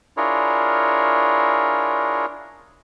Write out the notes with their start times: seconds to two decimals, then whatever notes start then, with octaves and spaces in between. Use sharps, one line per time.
0.17 D4 E4 F4 G#4 A#4 C#5